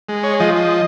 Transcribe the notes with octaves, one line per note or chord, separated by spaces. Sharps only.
G#3
C#5
F3 D#5
D#5